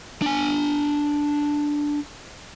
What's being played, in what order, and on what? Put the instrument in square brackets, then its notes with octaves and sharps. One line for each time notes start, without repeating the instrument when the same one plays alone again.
[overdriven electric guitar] D4 G#5